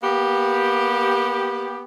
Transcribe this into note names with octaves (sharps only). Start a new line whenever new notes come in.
A#3 B3 G4